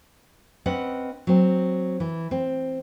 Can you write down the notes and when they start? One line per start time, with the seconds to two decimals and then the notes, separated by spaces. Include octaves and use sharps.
0.66 C4 C#4 B4 D#5 F#5
1.27 F#3 C4
2.00 E3
2.31 C4